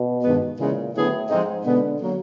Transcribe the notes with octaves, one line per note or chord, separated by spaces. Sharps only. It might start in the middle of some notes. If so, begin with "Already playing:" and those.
Already playing: B2
G2 D#3 G#3 B3
A#2 C#3 E3 G#3
A2 D3 F#3 B3 E4 G#4
G#2 F3 G#3 C4 D#4
B2 D3 G#3 B3
D3 F#3 A#3